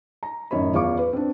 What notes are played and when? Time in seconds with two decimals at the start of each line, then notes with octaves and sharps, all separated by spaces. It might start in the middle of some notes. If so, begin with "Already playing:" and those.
0.23 A#5
0.51 A1 F#2 D#3 C#5 D#5 B5
0.74 E2 F4 C#5 F5 C#6 D6
0.99 B4
1.13 C4 D4